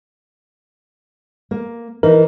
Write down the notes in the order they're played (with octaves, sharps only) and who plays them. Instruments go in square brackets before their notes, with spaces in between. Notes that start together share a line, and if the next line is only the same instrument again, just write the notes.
[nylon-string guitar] A#3
[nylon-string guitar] E3 D#4 [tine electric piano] A#4